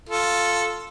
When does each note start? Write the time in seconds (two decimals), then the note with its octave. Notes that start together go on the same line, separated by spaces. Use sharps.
0.09 F4 A4